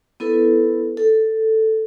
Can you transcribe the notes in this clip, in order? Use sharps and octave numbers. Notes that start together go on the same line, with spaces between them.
B3 E4 A4 B4
A4